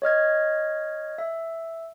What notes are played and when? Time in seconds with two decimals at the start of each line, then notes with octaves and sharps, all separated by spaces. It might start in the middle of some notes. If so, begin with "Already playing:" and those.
0.02 C#5 D#5 F6 G#6
1.18 E5